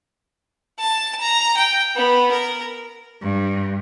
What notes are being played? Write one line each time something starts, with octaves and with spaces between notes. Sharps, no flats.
A5
A#5
G5
B3
A#4
G2